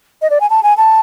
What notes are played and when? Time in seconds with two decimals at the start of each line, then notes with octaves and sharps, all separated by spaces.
0.22 D#5
0.30 D5
0.40 G#5
0.50 A5
0.63 G#5
0.77 A5